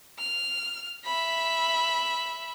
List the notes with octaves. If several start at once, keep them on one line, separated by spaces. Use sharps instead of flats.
F6
E5 B5